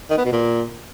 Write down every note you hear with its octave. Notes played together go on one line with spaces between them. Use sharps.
D#3
B3
B2
A#2